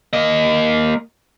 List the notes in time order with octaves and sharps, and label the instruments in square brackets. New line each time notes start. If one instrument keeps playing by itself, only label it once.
[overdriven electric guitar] A#3 D#5